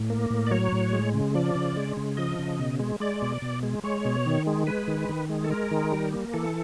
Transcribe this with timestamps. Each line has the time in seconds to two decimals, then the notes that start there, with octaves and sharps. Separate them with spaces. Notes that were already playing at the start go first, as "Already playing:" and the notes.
Already playing: A2
0.10 A#3
0.30 A2
0.47 D5
0.51 F#3 C#5
0.72 A2
0.93 G#3
1.14 C#3
1.35 F3 D5
1.55 C#3
1.77 G#3
1.97 C#3
2.17 F3 D#5
2.39 C#3
2.59 B2
2.80 G#3
3.00 G#3 D5
3.22 B2
3.42 B2
3.63 G#3
3.84 G#3 C#5
4.05 B2
4.26 D#3
4.47 G#3
4.67 G#3 B4
4.88 D#3
5.09 D#3
5.29 G#3
5.44 A4
5.50 G#3 A#4
5.71 D#3
5.92 G3
6.13 A#3
6.34 E3 A4